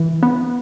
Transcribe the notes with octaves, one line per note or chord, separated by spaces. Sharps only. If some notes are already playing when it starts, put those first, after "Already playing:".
Already playing: E3
B3